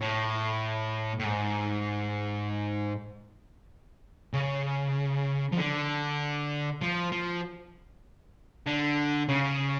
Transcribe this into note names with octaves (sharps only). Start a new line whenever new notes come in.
A2
A2
G#2
C#3
F3
D3
F3
F3
D3
C#3